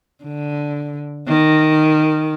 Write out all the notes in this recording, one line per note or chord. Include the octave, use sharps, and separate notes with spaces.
D3
D#3